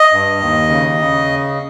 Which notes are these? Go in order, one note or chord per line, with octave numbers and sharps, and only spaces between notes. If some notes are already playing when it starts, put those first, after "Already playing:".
Already playing: D#5
G2
D#2
C#3
C#3